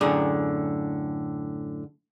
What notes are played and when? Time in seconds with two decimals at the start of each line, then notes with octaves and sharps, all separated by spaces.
0.01 F#2 A2 D3 G#4 A#5